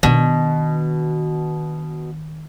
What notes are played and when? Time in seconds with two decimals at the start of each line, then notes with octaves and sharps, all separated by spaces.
0.03 B2 D#3 D4